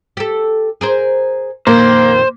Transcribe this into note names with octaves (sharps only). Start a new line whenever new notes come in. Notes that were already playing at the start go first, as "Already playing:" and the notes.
G4 A4
G#4 A#4 C5
F2 A#2 D#3 A#3 C5